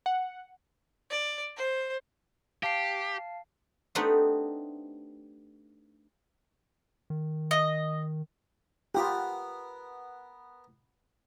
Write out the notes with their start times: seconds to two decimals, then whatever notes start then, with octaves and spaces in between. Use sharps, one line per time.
0.06 F#5
1.10 D5
1.57 C5
2.63 G4 F5 A5 C7
3.95 A3 B3 C4 D4 D#4 G4
7.10 D#3
7.51 D#5
8.94 B3 F4 G4 A#4 F#5